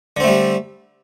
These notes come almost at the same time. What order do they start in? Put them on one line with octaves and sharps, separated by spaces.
D3 C4 A3 G3